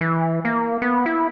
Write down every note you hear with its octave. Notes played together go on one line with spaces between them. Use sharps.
E3
A#3
B3
E4